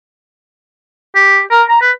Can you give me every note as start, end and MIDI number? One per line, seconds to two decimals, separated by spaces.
1.15 1.41 67
1.51 1.63 70
1.69 1.79 82
1.81 1.91 71